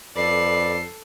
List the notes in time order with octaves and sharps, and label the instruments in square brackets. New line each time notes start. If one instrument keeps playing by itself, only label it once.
[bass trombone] F2 [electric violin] A4 C7 [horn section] B4 D5